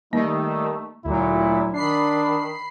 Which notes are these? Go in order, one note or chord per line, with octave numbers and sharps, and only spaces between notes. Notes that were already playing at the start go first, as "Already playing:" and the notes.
D#3 G3 A3 A#3 D#4
D2 A#2 F#3 E4
D#3 D4 B5 C7